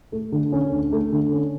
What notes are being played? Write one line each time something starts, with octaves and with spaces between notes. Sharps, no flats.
A3
D3
C#4
D2
A3
D3
C#4